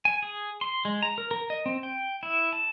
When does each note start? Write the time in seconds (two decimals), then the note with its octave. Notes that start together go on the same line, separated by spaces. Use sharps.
0.05 G#5
0.23 G#4
0.61 C6
0.85 G#3
1.02 A#5
1.18 A#4
1.31 A#4
1.50 D#5
1.66 C4
1.83 G5
2.23 E4
2.53 A5